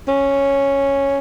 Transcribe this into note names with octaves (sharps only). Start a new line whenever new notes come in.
C#4